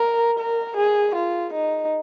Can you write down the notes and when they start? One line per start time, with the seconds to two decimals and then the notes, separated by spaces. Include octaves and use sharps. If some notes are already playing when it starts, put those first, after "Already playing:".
Already playing: A#4
0.39 A#4
0.77 G#4
1.15 F4
1.53 D#4